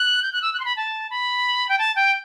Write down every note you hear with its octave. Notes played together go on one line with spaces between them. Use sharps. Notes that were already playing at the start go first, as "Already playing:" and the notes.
Already playing: F#6
G6
F#6
E6
F#6
C6
B5
A5
B5
G5
A5
G5